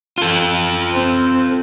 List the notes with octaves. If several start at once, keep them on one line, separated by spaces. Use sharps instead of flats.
F4 A4
C4